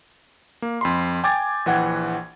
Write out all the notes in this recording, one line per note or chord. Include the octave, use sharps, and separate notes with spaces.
A#3
F2 B5 C6
G5 G#5 D6 G#6 A6
A#1 E3 F#5 G5 G#6